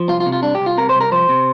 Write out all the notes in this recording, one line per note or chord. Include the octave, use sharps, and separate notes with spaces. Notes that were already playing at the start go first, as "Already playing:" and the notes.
Already playing: F3
C2 F4
F4
C3
F4
C2 D4
G4
C2
F4
C3 A#4
C5
C2
A#4
F3 C5
C3